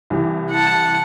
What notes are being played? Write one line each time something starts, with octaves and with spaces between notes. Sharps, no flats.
C2 E3 G4
F#5 A5